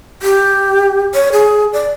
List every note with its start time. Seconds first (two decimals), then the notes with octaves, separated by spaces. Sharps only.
0.22 G4
1.14 C#5
1.33 G#4
1.73 D5